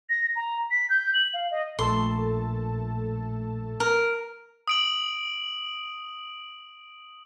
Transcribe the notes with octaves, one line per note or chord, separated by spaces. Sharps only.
A#6
A#5
B6
G6
F#7
F5
D#5
A#1 A3 A4 A5 C6
A#4
D#6 D7 F#7